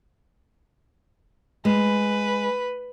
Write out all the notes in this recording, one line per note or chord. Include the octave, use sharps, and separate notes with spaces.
G#3 B4